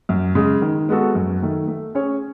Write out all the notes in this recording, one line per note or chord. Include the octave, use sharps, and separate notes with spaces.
F#2
C#3 G#3
D#3
G#3 B3 F#4 A4
F#2
D#3 A3
A3
C#4 G#4 C#5